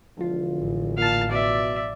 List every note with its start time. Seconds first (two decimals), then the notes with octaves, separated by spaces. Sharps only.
0.17 E1 D3 F3 F4
0.58 A1
0.98 A#2 F5 A5
1.31 B2 D5 E5